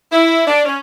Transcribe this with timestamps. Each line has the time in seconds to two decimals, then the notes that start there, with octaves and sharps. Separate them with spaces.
0.12 E4
0.47 D4
0.65 C#4